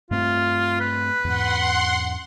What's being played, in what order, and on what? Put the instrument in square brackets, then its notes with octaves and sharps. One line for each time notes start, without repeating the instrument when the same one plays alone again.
[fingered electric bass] G2 A3 C4 [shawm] F4
[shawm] B4
[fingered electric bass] E2 G#2 [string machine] F#5 C6